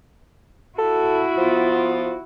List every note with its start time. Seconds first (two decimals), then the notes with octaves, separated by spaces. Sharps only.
0.78 E4 F#4 A4
1.38 F3 B3 F4